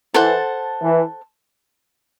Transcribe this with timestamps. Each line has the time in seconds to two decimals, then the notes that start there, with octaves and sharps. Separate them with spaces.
0.14 E3 A4 C5 F#5 A5
0.81 E3